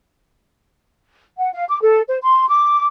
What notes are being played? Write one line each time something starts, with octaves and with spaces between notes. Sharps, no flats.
F#5
F5
D6
A4
C5
C6
D6